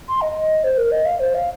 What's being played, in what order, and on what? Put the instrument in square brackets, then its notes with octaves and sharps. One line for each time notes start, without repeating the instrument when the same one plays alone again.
[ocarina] C6
D#5
C5
A#4
D#5
F5
C5
F5